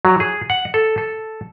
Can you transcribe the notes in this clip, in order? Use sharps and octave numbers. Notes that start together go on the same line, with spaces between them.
F#3
G#4
F#5
A4
A4